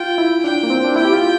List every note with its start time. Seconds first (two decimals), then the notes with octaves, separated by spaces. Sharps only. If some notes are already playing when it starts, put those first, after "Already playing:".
Already playing: F4 G5
0.18 E4
0.44 D4 G5
0.63 A#3
0.70 C4
0.85 D4
0.96 E4 G5
1.05 G4
1.13 F4